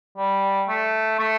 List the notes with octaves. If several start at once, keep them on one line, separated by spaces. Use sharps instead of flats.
G3
A3
A3